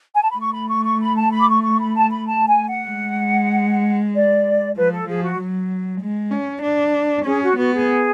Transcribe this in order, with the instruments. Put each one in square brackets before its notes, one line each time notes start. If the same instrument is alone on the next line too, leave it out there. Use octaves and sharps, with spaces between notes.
[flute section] G#5
A5
B5
[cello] A3 [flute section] C#6
[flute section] B5
C#6
C#6
B5
A5
B5
D6
C#6
C#6
B5
A5
B5
A5
G#5
F#5
[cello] G#3
[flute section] D5
[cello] F3 [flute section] B4
[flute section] A4
[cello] F3 [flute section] G#4
[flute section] F#4
[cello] F#3
G#3
C#4
D4
[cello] C#4 [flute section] G#4
[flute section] F#4
[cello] B3 [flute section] F#4
[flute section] G#4